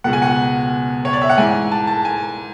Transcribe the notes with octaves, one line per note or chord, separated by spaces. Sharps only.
C#2 B2 F#5
G#5
F#5
C#5
D5
E5
F#5
G#2 E3 G#5
A5
A5
G#5